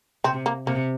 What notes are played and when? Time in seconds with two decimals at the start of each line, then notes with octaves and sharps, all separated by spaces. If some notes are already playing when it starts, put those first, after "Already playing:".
0.24 C3 C4
0.46 A#3
0.67 C3 A#3